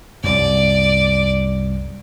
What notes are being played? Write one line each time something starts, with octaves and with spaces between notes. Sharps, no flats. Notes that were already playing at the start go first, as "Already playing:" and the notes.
C2 F#2 D5